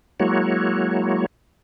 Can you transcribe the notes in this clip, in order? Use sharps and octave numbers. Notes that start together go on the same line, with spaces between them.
F#3 G#3 A#3 E4 F#4 C#5